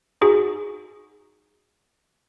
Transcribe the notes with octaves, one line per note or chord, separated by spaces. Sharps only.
D#4 F#4 G#4